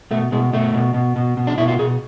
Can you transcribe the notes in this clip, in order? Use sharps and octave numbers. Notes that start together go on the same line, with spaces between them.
B2 A3
B2 G#3
B2 A3
B2
B2
B2
B2
D4
B2 E4
F4
B2 G#4